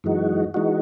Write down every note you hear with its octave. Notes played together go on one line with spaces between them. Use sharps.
F#2 E3 G#3 D#4 F#4
E3 G#3 D#4 F#4